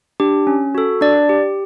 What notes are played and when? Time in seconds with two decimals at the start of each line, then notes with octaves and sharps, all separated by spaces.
0.20 D4 G4
0.47 C#4
0.75 F#4 A4
1.01 D4 D5
1.29 G4